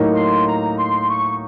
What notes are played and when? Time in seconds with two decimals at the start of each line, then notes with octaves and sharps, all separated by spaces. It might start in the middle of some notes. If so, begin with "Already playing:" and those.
Already playing: A2 F#3 A#3 D#4
0.14 C6
0.46 A#5
0.77 C6
1.08 C#6